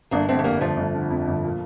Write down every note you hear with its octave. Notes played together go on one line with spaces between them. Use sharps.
G1 A#3 D4
D3 A3 C4
A3
F2 G3 A#3
G1 F3 A3
G1
D3
F2
G1
A#2